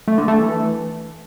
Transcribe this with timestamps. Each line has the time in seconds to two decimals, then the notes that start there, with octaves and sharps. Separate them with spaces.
0.08 A3
0.18 D3
0.28 A3
0.38 E3